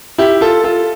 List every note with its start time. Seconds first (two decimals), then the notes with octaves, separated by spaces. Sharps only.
0.18 E4 G4
0.41 F4 A4
0.64 F4 A4